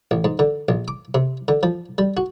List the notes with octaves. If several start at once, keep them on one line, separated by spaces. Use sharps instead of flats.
A1
G#2
D3
A#1
D6
C3
D3
F3
G3
F#4